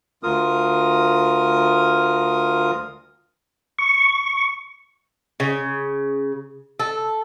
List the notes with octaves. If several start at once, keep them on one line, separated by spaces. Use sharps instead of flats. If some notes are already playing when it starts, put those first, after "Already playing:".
D2 F4 A#4 D#6
C#6
C#3
A4